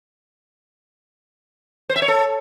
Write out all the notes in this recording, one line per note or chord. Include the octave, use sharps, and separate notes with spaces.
C5
E5
C#5
A4